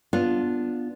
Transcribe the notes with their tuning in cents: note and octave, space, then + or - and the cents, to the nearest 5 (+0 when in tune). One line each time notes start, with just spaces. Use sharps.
B3 -10 D4 +0 F4 +0